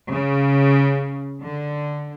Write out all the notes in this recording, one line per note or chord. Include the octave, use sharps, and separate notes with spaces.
C#3
D3